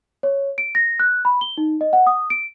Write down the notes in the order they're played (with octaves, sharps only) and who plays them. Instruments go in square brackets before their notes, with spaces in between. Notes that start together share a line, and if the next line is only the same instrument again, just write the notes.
[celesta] C#5
D7
A#6
F#6
B5
G7
D#4
D#5
F#5
D#6
D7